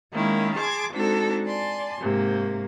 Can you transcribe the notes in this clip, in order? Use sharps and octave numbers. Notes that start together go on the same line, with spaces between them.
D#3 G#3 A#3 C#4 E4
G#4 A5 C6 D6 G#6
G#3 C4 D4 D#4 F#4 A4
D5 G#5 A5 C6
G#2 C3 A#3